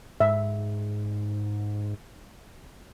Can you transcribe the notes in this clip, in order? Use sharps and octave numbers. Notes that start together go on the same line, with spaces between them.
G#2 E5